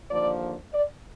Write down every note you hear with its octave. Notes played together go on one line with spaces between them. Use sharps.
D#2 D3 F3 A#3 D5
D5